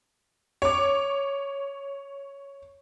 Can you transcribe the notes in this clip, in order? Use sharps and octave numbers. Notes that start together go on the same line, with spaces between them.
C#5 D6